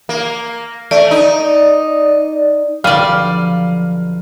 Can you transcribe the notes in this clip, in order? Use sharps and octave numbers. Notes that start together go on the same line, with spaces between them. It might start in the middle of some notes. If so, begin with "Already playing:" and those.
A#3
A3 D5
D#4
B1 D3 F3 G3 D5 F5 F6 D#7